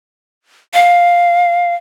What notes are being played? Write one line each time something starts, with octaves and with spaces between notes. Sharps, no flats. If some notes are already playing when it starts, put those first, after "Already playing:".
F5